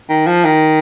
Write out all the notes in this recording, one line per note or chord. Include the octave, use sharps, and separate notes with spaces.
D#3
F3
D#3